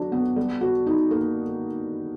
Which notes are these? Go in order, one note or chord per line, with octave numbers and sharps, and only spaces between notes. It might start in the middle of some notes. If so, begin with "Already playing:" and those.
Already playing: F#3 D4 F#4
B3
G3
F#4
D#4
A#3